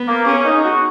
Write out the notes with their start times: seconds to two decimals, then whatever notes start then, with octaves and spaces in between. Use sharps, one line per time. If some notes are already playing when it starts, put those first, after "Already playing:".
Already playing: B3
0.08 A#3
0.26 C#4 G#4
0.45 D#4
0.64 F#4